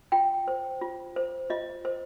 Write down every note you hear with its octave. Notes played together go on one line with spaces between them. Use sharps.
F4 G5
C5
F4
C5
F4 D#5
C5